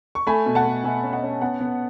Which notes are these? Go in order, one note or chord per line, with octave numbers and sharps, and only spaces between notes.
C#6
A3 G#5 B5
B2
F#5 A5
A3
B2 E5 G#5
C#4
D#5 F#5
C#4
B3 F#5 A5
B3